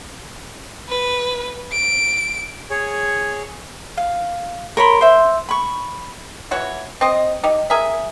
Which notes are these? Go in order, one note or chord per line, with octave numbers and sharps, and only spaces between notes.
B4
D7
G#4 C#5
F5
A#4 C#5 B5 C6
C5 E5
B5 C#6
E3 F#4 C#5
C4 D#5
D#4 G4
G#4 A#4 E5